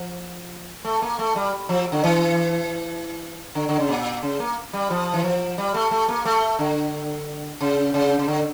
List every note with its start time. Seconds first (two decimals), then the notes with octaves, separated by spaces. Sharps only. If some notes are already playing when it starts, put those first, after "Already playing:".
Already playing: F3
0.85 A3
1.02 A#3
1.19 A3
1.36 G3
1.69 F3
1.92 D3
2.04 E3
3.55 D3
3.69 D3
3.79 C#3
3.89 A#2
4.23 C#3
4.40 A#3
4.73 G3
4.90 F3
5.13 E3
5.24 F3
5.58 G3
5.74 A3
5.91 A3
6.08 A#3
6.25 A3
6.59 D3
7.61 C#3
7.94 C#3
8.19 C#3
8.28 D3